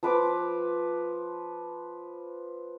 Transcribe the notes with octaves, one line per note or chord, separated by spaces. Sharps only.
F3 B4 D6